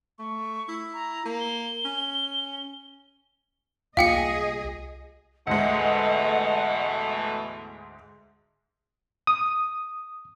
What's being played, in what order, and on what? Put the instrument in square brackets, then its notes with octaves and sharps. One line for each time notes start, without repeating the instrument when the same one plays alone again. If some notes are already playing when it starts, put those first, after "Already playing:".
[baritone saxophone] A3 [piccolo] C#6
[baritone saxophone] E4
[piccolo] A#5
[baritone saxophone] A#3
[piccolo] G7
[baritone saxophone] C#4
[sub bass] C2 [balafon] A#3 F4 [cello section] G#4 D#5 [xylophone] F5 G5 C#7
[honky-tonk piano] D2 G#2 G#3 [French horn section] B2 E3 A3 [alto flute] D#5 [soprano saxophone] F#5
[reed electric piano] D#6